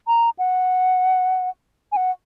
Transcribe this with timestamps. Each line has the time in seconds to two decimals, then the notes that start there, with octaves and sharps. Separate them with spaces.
0.07 A#5
0.39 F#5
1.92 G#5
1.96 F#5